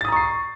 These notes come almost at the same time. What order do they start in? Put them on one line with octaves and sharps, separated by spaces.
A6 D#6 A#5 C#6 C7